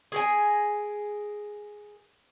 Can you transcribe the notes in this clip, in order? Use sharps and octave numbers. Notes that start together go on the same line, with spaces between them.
G#4 A#4 G#5